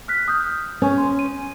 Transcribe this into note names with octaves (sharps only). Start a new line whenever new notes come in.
F6 F#6 B6
D#6 F6 G6
C#4 G#5 C#6
C6
D#7